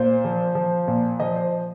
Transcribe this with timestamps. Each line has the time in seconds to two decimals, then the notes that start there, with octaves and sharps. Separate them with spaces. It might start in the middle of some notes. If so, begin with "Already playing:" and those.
Already playing: A#2 C5
0.24 F3
0.55 F3
0.88 A#2
1.20 F3 D#5
1.36 C5